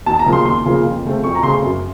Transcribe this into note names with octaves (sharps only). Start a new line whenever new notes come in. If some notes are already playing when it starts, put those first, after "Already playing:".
D#2 A5
A#5
C#3 F3 A#3
C6
D#2 C6
C#3 F3 A#3
F2
C#3 A3 C4
F2 C#6
A#5
C#3 A3 C4 C6
F#2